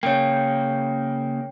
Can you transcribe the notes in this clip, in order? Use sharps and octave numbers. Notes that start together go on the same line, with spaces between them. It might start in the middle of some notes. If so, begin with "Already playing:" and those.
C#3 A#3 C#5 G5